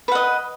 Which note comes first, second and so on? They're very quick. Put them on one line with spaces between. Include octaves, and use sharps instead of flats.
B4 F#5 D#5